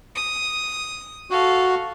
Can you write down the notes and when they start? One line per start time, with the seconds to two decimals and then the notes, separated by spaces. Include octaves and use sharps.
0.15 D#6
1.31 F#4 A4 F5